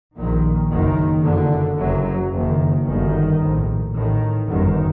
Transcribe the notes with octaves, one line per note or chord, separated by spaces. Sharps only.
A#1 A#2 D#3
F#1 F#2 D#3
F#1 F#2 D3
F#1 F#2 F#3
F#1 F#2 D#3
G1 F#2 D#3
A#1 A2
A1 A2 D#3
G1 F#2 D#3